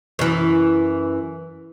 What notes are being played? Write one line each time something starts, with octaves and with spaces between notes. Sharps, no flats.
F#2 E3